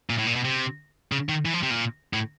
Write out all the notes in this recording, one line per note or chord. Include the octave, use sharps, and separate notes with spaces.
A#2
A2
A#2
B2
C3
C#3
D#3
E3
F3
C3
A#2
A2